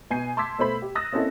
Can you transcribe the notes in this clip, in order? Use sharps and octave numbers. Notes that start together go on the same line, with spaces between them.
B2 G#5 G6 C7
A5 C6 D6 E6 G#6 B6
B2 A3 C5 B5 B6
G4
D#6 E6 F#6 A6 A#6
A#3 C4 C#4 E4 A4 D#5